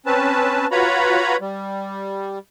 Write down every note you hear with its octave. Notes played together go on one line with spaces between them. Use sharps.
C4 C#4 B4 A5
F4 F#4 B4 C#5 A#5 B5
G3